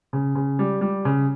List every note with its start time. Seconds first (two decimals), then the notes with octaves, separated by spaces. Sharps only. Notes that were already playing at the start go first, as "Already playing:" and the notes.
0.13 C#3
0.35 C#3
0.59 G3
0.81 G3
1.05 C#3